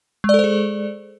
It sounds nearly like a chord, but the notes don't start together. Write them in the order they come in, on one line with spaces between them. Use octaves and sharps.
G#3 D5 A4 C5 G#4